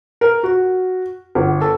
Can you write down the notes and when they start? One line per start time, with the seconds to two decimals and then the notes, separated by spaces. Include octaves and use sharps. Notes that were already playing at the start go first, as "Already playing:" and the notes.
0.21 A#4
0.43 F#4
1.35 G1
1.61 A4